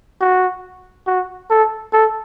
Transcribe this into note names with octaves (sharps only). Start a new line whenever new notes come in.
F#4
F#4
A4
A4